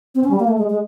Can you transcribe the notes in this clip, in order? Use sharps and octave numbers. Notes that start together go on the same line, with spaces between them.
C4
C#4
G3
A#3
A3
G#3
G#3